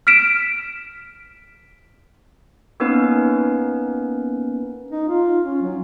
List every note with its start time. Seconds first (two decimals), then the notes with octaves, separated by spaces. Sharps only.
0.07 F6 B6 D7 E7
2.80 A#3 B3 C#4 D#4 A#4 B4
4.91 D#4
5.08 F4
5.44 C#4
5.62 F#3